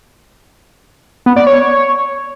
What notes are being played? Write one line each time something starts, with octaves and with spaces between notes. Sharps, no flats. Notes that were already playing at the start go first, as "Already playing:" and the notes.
B3
D5
C#5